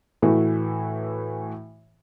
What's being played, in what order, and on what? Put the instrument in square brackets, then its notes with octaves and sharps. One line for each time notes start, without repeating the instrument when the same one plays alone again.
[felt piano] A2 E3 A3 E4 F#4